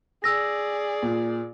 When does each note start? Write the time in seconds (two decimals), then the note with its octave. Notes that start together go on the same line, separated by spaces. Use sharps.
0.24 G#4 D5 E6 A#6
1.03 A#2